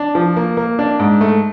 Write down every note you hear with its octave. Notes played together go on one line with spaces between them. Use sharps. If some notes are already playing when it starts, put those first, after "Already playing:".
Already playing: D4
F3
A#3
A#3
D4
G#2
A3